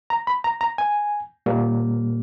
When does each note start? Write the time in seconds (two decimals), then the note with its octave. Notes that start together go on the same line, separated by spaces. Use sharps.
0.10 A#5
0.27 B5
0.44 A#5
0.61 A#5
0.78 G#5
1.46 A#2 G3 A#3